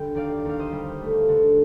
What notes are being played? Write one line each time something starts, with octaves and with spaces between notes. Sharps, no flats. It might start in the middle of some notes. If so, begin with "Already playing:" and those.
Already playing: D3 G3 G5
D#2 D5 F5
D#2 F5
C5 D#5
G3
A3
D3